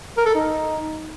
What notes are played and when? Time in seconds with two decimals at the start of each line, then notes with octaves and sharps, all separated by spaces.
0.17 A#4
0.26 A4
0.35 D#4